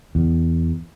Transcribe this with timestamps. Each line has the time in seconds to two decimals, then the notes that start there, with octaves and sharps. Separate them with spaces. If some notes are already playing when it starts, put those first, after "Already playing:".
0.15 E2